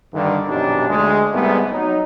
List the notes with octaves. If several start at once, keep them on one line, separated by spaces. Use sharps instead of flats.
G2 D3 D#3
A#1 F#2 B2 D4 D#4 G4
D2 G#3
C2 G#2 C3 G3 A3 B3
F#3 D#4